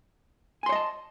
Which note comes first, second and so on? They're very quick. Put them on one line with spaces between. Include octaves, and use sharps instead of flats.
G#5 C6 C#5 D#5 A5